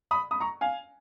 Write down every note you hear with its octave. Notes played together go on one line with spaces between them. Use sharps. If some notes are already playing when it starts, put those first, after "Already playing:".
B5 D#6
B5 D#6
A#5 C#6
F5 G#5